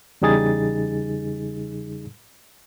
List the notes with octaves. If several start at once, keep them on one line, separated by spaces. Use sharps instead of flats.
E2 C#3 G3 D#4 G#4 A6